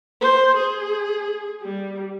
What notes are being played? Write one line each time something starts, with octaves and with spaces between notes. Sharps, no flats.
C5
G#4
G3